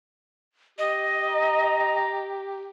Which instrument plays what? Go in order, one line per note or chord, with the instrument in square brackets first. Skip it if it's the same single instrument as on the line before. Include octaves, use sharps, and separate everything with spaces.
[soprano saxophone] G4 [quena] D#5
[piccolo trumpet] A#5